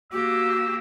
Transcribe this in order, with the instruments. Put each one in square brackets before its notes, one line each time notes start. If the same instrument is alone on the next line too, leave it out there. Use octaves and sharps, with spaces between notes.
[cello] A#3 G4 [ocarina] F#4 [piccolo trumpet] E6